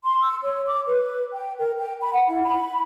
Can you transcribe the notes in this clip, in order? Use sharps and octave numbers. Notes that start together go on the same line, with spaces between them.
C6
E6
C#5
D6
B4
G5
A#4
G5
B5
F#5
E4
B5